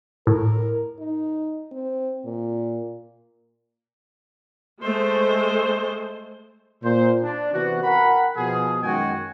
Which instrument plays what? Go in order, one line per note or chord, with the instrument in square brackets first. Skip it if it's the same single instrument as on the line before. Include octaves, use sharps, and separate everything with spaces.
[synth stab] A2 [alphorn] A#4
[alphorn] D#4
C4
A#2
[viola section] G#3 A3 C5
[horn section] A#2 C5
D4
C3 E3 B3 F#4
A#4 F#5 G5 B5
B2 F3 G#4
F#2 D#3 G#3 F#4 G5 G#5